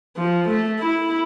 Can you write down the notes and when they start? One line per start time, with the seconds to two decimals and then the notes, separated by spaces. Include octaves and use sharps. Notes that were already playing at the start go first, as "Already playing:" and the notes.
0.17 F3
0.48 A3
0.80 E4